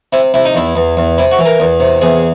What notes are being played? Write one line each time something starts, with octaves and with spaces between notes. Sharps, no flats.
C3 E4
C3 E4
D#4
E2 E4
E2
E2
C3 E4
F#4
E3
A#4
E2
C3
E2 G#4